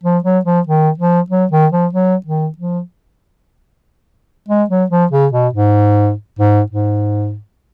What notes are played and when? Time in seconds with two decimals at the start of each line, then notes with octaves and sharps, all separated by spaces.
0.04 F3
0.24 F#3
0.45 F3
0.67 D#3
0.98 F3
1.30 F#3
1.51 D#3
1.72 F3
1.93 F#3
2.26 D#3
2.58 F3
4.48 G#3
4.70 F#3
4.90 F3
5.11 C#3
5.33 B2
5.53 G#2
6.39 G#2
6.70 G#2